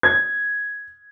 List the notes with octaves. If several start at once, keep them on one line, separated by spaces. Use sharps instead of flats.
G#6